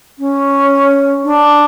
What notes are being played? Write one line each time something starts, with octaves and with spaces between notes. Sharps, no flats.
C#4
D4